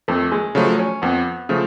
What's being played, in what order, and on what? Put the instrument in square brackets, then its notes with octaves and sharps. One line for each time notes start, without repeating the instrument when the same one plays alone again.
[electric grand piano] F2 [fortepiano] A3
[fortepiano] G#3
[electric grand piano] C#3 F3 A3 [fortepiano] F#3
[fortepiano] C#4
[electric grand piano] F2 [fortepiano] B3
[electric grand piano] C#3 F3 A3